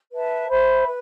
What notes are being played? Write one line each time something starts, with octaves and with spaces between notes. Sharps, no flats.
B4 E5 A5
C5 E5 B5
B4